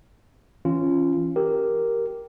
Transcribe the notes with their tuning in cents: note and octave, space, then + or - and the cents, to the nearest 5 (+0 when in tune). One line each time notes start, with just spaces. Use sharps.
E3 +0 C#4 -10 F4 -20
G4 -5 A#4 +0